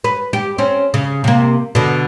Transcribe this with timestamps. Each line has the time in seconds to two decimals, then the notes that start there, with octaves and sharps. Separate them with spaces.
0.04 B4
0.33 G4
0.58 C4 C#4
0.94 C#3
1.24 C3 A#3
1.75 B2 D3